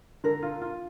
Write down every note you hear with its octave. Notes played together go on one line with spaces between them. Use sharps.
D3 A#4
F4
F4